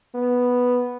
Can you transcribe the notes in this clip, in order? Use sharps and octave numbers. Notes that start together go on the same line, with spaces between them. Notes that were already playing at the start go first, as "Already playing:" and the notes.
B3